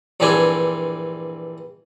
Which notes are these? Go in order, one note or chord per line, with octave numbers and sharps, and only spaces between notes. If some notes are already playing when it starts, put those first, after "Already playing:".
A#1 G2 E3 C4 D4 G#5